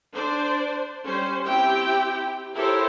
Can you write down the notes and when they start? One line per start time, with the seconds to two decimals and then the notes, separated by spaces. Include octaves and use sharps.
0.14 D4 C5 D5
1.04 G3 C#4 C5
1.46 C4 E4 G4 G5
2.55 E4 G4 A4 A#4 C5 C#5